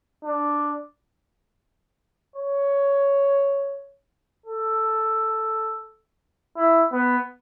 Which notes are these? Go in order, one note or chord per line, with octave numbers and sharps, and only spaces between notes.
D4
C#5
A4
E4
B3